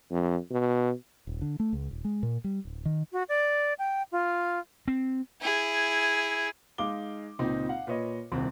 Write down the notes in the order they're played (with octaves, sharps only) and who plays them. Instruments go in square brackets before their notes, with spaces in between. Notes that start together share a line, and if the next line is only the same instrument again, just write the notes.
[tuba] F2
B2
[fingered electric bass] D#1
D3
A3
C#2
D#1
G#3
A#2
G3
D1
D#3
[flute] F#4
D5
G5
F4
[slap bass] C4
[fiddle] E4 G#4
[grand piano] G#3 D#4 F5 D6 G7
C#2 A#2 C4 D#4
F5 F#5
A#2 B4 C#5 D#5
D#1 C2 C4